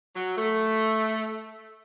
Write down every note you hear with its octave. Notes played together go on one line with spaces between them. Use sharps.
F#3
A3